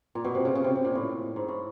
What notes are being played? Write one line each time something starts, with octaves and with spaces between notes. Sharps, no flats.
A#2
B2
C3
C#3
C#3
C3
C3
A#2
A2
G#2
A2